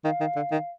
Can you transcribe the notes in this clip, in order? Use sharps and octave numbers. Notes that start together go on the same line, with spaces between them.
D#3 F5
D#3
D3
D#3